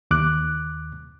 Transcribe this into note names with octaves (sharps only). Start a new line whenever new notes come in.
D#2 D6 F#6